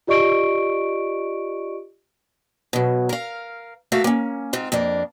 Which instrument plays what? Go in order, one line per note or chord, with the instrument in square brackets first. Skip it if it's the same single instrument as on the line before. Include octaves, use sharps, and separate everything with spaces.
[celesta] F4 G4 D5 D#5 C#6 D7
[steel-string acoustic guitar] B2 F#3
A#4 F5
A3 A#3 F#4 E5 F5
A#3 C#4
G#2 C4 F4
F2 A#3 D4